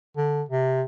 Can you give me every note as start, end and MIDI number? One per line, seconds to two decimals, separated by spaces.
0.17 0.43 50
0.49 0.83 48